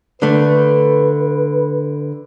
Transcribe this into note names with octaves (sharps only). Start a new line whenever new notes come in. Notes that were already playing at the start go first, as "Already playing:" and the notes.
D3 A3 B4